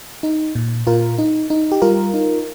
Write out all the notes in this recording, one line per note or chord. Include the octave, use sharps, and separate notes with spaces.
D#4
A#2
A#2 F4 A#4
D#4
D#4
G4
G3 F4 A#4
D#4